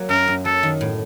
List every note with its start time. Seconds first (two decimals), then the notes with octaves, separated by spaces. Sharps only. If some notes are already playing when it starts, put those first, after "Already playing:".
Already playing: F#3 A#3
0.09 F#2 A#4
0.27 F#2
0.45 F#3 A4
0.63 D#3
0.81 A2